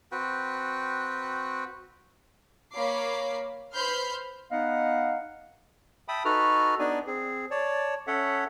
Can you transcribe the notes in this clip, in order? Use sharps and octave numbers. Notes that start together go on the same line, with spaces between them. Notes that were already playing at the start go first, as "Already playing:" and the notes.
C4 F#4 B4 G5
A#3 C#5 F5 B5 D6 C7
B4 C5 B5 F6 G6 C7
B3 D#4 D#5 F5 F#5
E5 G5 A5 B5 D#6
D#4 F#4 A4 B4 F6
B3 D4 D#4 D5 G#5
C4 G#4
C#5 D5 A5
C#4 A4 C#5 E5 F#5